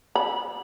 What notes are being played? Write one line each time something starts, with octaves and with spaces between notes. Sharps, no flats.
B5